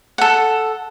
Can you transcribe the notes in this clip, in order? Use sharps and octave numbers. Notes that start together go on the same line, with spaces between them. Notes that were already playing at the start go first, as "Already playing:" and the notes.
A4 F#5